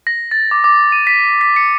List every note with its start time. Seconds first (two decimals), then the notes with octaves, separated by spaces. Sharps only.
0.07 A#6
0.31 A6
0.51 D6
0.64 D6
0.92 D#7
1.07 B6
1.41 B6
1.56 C#7